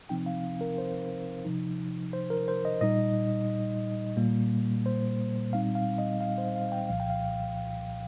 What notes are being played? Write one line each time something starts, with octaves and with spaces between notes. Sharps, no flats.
C3 F3 C4 D#4 G5
F5
A#4
C5
C3 F3 D#4
C5
A#4
C5
D#5
A#2 G3 D#4 D#5
A#2 G3 A#3
C5
A#2 G3 C4 D#4 F5
F5
D#5
F5
C5
F5
G5
C2 A#2 F3 F5
G5
F5